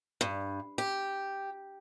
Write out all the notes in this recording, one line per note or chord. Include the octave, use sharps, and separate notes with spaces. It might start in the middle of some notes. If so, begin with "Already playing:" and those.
G2
G4